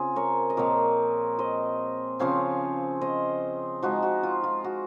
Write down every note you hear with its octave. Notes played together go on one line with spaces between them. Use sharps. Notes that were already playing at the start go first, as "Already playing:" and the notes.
Already playing: C#3 C4 F4 G#4
A#4 C#5
D#5
A#2 F3 C4 A#4 C#5
C5 D#5
C#3 F3 C4 C#5 F5
C5 D#5
F3 G#3 D#4 F#4
F#4
F4
F4
F#4